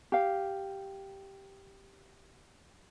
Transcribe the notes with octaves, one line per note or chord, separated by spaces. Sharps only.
G4 F5